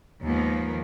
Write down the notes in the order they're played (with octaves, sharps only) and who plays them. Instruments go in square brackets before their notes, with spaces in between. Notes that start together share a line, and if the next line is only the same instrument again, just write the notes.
[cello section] D#2 G#2 D#3 F3 A#3 B3